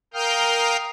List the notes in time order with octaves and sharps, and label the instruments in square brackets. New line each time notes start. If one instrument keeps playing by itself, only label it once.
[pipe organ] A#4 F5 G5 D#6 F6 G6